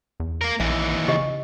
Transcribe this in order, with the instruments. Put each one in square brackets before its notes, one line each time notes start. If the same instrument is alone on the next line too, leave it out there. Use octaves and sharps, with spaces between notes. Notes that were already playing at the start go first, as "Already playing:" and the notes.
[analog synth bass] E2
[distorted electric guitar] A#3 A#4
[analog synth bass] A#1 [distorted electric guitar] D#2 E3 [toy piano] E5
[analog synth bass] C#3 [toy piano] G4 D#5